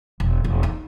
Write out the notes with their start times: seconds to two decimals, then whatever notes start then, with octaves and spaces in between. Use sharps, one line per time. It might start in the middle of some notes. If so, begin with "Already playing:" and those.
0.20 E1
0.44 E1
0.63 D#4